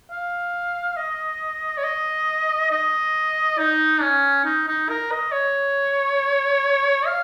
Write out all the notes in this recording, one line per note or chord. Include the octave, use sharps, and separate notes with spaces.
F5
D#5
C#5
D#5
D#5
D#4
C#4
D#4
D#4
A#4
D#5
C#5
F5